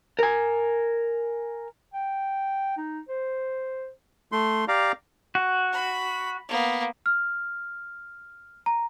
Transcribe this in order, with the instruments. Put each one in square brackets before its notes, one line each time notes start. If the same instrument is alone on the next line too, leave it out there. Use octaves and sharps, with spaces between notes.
[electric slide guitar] A#4 G#5
[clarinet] G5
D#4
C5
[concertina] A3 C6
G4 D5 F5 A#5
[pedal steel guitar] F#4
[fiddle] B5
A#3 B3
[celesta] F6
A#5